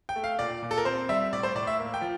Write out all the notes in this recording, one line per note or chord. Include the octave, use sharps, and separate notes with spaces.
G5
A3
F5
A#2 D5
A#2
A4
A#4
C4 C5
G3 E5
A2 D5
C5
A2 D5
E5
A#3
G5
F3